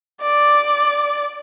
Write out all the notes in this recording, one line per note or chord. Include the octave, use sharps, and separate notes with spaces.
D5